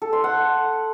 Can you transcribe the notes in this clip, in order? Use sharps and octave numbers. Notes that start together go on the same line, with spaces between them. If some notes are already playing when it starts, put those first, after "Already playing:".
A4
C6
F#5